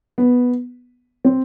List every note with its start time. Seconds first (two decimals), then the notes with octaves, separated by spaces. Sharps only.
0.18 B3
1.25 C4